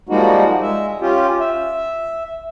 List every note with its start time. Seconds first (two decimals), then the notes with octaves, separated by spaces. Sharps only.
0.09 F3 G3 G#3 A#3 D#4 F#4
0.62 G#3 E5
1.01 C#4 F4 G4
1.40 E5